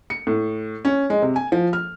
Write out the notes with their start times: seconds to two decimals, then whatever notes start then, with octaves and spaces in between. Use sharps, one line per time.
0.10 C#7
0.27 A2
0.85 C#4
1.10 G#3
1.22 C3
1.36 G#5
1.52 F3
1.73 F6